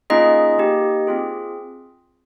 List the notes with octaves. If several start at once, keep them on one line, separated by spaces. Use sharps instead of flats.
A#3 C#4 D#4 F4 G#4 D#5
A#3 D#4 G4
C4 F4 G#4